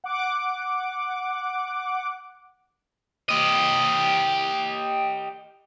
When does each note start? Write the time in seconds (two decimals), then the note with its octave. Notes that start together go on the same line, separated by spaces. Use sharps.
0.04 F#5 D6
3.29 G4 D#5